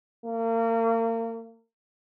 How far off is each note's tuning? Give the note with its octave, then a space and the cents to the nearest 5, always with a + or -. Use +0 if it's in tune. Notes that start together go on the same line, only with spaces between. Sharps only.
A#3 -35